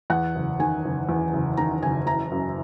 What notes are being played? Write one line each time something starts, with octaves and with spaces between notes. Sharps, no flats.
E2 F#5
F#1
D#3 G#5
F#1
E2
F#1
D#3 A#5
F#1 G#5
E3 A#5
F#2